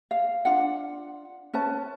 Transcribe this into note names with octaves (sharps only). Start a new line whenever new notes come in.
F5
D4 F4 F#5
C#4 B4 C5 A5